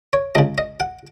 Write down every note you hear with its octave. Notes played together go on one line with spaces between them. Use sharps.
C#5
C#2 C#3 D#5
D#5
F#5